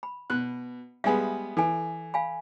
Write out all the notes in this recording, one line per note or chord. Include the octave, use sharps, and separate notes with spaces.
B5
B2 F#6
G3 G#3 B3 E5 G#5
E3 A4 G#5
F5 G#5 B5